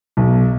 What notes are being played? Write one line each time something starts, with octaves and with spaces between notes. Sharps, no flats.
B1